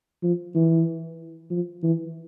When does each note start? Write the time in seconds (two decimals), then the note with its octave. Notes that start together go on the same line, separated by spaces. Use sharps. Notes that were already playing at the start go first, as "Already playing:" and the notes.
0.23 F3
0.55 E3
1.50 F3
1.83 E3